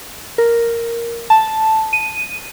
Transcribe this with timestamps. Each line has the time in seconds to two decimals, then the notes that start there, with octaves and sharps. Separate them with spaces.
0.38 A#4
1.30 A5
1.93 D#7